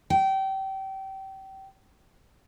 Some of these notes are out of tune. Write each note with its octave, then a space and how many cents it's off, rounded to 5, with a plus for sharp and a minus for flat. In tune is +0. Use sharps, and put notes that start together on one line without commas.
G5 -25